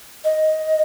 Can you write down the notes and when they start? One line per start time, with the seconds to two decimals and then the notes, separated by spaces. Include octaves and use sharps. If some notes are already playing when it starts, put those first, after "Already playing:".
0.24 D#5